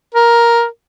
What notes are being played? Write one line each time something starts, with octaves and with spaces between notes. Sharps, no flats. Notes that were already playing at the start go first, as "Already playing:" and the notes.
A#4